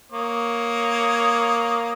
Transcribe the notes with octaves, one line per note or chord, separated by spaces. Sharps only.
A#3 C#5 D#6